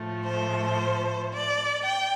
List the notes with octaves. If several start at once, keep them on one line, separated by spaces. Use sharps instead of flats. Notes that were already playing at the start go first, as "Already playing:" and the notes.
Already playing: A2 F3 A3
C5
D5
G5